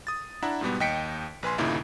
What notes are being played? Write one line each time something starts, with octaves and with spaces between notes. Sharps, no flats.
D#6 A6
D4 E4 E5 F#5 A#5
G#2 B2 G3 B3
D#2 D#5 G5 B6 C#7 D7
A#1 B4 G#5 C6
G1 D#2 A#2 C#3 D#4 E4